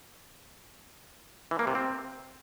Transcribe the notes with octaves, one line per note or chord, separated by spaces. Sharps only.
E3
A#3
C3
C4